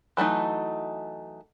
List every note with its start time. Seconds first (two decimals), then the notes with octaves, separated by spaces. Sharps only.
0.17 E3 F#3 A3 D#4